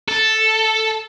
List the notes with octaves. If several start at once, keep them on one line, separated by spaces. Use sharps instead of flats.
A4